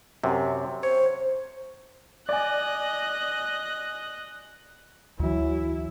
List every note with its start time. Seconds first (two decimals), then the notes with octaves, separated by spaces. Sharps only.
0.24 F#2 C3
0.83 C5 C#5
2.29 D5 D#5 G#5 F#6
5.20 D2 E3 F#3 E4